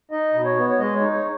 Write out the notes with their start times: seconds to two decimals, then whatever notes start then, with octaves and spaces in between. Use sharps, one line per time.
0.11 D#4 D#5
0.34 B2
0.45 C#5
0.56 B3
0.70 C#5
0.79 G#3 D#5
0.95 C#5
1.01 D#4
1.12 C#5